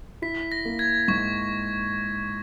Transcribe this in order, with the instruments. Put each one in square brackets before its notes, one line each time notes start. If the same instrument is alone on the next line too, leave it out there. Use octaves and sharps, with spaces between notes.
[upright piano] E4 [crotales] B6
[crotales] A#6
[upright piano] A#3
[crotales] G#6
[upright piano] G#2 [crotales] C#6